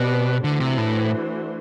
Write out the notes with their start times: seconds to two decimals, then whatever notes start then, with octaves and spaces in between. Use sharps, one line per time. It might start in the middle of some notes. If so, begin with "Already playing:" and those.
Already playing: B2 C4 G4 B4 D5
0.44 D3 E3 A3 D4 F#4 C5
0.60 C3
0.78 A2